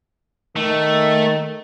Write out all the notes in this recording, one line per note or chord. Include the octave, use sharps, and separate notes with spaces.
D#3 A3